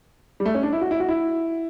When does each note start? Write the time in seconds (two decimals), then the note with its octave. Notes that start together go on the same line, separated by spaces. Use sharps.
0.40 G3
0.45 A3
0.55 C#4
0.63 D4
0.73 E4
0.81 F#4
0.91 E4
1.00 F#4
1.09 E4